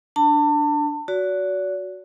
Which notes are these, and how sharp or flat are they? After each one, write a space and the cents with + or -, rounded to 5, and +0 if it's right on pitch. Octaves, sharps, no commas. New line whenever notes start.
D4 +0 A5 +30
F#4 +0 D5 -40